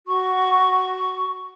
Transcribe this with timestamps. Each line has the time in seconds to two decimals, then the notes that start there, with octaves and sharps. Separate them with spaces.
0.06 F#4 C#6